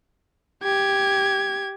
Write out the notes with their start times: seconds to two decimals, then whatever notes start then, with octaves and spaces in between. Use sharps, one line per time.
0.63 G4 G#6